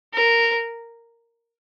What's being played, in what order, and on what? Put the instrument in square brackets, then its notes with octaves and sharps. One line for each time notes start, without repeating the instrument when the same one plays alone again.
[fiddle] A#4